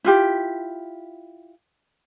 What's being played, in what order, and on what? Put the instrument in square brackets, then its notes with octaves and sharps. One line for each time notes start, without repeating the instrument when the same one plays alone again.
[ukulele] E4 F4 G4